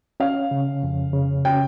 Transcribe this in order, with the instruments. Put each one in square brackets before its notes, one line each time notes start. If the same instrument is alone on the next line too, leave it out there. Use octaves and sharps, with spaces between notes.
[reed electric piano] C#4 [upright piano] F5
[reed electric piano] C#3
F2
C#3
[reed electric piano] C#4 [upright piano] G5